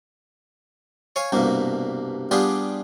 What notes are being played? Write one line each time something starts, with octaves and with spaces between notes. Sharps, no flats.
C#5 F5 G#5
C2 G2 B2 A#3
G3 B3 D4 F4 G4 G#4